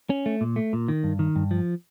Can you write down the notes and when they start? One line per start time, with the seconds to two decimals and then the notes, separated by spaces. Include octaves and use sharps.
0.10 C#4
0.26 A3
0.41 A#2
0.56 A3
0.73 A#2
0.88 D#3
1.04 G2
1.19 D#3
1.36 G2
1.51 F3